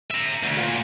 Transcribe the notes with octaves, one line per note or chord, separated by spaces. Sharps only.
E5 A#5
D2
A#2